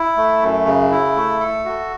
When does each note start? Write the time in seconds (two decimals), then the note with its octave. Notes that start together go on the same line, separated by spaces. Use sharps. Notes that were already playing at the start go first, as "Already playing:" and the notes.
Already playing: E4
0.17 A3
0.42 F#2
0.66 C#3
0.91 E4
1.16 A3
1.40 A4
1.65 F#4